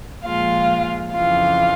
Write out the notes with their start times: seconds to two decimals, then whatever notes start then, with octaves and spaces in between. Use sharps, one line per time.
0.24 A#2 F3 G#3 F4 F5
1.12 F2 C#3 E3 F4 F5